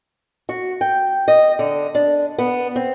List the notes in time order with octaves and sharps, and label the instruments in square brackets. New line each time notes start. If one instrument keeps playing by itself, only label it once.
[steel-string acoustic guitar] F#4
G5
D#5
D3
D4
B3
C4